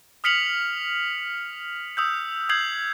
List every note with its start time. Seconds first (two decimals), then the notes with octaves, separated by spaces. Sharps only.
0.24 D#6 F6 B6 C#7 F7 F#7
1.97 D#6 E6 G6
2.49 D#6 G6 G#6 C7 F#7